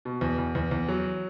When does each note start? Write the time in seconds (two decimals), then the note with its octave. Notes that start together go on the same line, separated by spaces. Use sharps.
0.05 B2
0.21 E2
0.38 E2
0.55 E2
0.71 E2
0.88 F#3